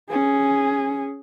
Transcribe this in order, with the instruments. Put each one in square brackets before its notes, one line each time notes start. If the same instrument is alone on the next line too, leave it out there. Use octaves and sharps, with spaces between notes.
[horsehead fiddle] C#4 G#4